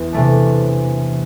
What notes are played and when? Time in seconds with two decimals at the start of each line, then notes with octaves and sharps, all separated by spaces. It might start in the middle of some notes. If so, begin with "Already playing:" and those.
Already playing: E2
0.13 C3 E3 A3 D4